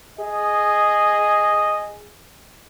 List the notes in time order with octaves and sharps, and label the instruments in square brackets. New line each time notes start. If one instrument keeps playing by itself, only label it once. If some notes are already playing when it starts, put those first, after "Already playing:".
[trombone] G#4 [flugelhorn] D#5